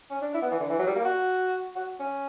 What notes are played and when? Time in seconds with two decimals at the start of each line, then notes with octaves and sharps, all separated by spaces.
0.10 C#4
0.21 D4
0.34 E4
0.42 B3
0.51 E3
0.60 D3
0.69 E3
0.79 F#3
0.87 G3
0.95 A#3
1.04 F#4
1.76 F#4
2.00 C#4